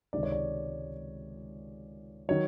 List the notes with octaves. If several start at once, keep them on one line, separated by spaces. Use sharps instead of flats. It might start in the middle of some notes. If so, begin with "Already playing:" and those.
C#2 C3 D#3 D5
C#5
D5
D#3 F#3 C#5